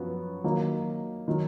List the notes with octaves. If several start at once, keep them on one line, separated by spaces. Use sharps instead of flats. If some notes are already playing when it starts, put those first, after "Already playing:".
Already playing: F#2 F3 B3 F#4
D#3 F#3 A#3 D#4
D#3 F#3